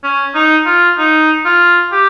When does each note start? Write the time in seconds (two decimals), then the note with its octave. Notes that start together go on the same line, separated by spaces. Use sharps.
0.04 C#4
0.35 D#4
0.66 F4
0.98 D#4
1.45 F4
1.92 G4